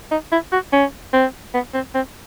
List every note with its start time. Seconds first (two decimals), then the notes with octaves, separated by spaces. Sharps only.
0.11 D#4
0.32 E4
0.52 F#4
0.73 C#4
1.13 C4
1.54 B3
1.74 C4
1.95 C4